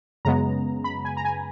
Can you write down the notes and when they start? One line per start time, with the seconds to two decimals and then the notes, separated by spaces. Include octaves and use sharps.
0.25 F#2 C#3 G#3 B3 A#5
0.84 B5
1.05 G#5
1.17 A#5
1.25 G#5